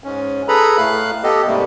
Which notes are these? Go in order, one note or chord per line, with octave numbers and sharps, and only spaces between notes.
G#2 C#4
G#4 A4 B4 A#5 B5
A2 A3 F5 F#6
B3 G4 A4 D#5
G#2 C3 G3 A3 A#3